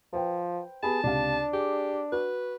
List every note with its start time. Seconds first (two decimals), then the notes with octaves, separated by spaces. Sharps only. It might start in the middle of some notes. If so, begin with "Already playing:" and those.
0.13 F3 B4 C5 G5
0.83 B3 G4 G#4 A5 B5
1.04 C#2 C3 D4 F5
1.53 G4 G#4
2.12 F#4 B4